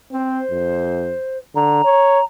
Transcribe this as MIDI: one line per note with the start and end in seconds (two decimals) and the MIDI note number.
0.12 0.41 60
0.12 1.37 72
0.51 1.15 41
1.55 1.80 50
1.55 2.24 82
1.84 2.20 73